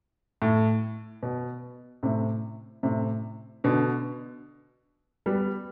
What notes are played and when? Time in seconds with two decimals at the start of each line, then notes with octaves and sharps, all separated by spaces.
0.42 A2
1.23 B2
2.03 A2 C3
2.83 A2 C3
3.64 B2 D3
5.26 G3 B3